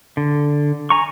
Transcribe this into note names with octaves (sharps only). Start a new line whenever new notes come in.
D3
G#5 A#5 C#6